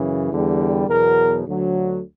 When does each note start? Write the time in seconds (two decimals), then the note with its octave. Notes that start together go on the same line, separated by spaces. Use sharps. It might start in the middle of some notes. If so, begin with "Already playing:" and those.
Already playing: F#2 C#3 E3
0.32 E2 D3 G3
0.88 E2 B2 F#3 A#4
1.45 D2 D3 F#3